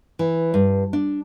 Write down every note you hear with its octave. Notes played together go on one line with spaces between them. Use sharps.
E3
G2
D4